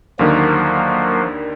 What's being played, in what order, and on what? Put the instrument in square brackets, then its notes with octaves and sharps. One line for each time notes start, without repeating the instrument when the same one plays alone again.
[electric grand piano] D#2 D3 D#3 [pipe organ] F3 F#3 A#3